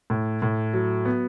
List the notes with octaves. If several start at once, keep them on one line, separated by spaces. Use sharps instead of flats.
A2
A2
F#3
B3